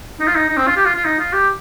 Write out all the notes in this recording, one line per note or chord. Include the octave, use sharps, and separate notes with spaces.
D#4
F4
D#4
D#4
C4
F4
G4
F4
F4
D#4
F4
G4